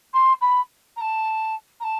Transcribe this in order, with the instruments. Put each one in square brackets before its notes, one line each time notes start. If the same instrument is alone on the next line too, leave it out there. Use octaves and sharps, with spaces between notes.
[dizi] C6
B5
A#5
A5
A#5
A5